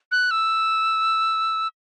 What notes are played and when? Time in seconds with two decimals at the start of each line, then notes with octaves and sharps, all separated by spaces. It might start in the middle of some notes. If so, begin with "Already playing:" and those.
0.11 F#6
0.31 E6